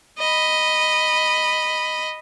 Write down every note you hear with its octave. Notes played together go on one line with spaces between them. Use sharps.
D#5 B5